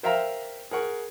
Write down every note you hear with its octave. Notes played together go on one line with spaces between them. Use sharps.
A#4 C5 E5 F5 G5 A#5
G#4 A#4 F#5 C#6